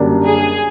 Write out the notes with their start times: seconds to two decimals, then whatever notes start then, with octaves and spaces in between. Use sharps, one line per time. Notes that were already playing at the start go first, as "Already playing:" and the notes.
Already playing: F#2 D3 G3 A#3 D4
0.23 G#4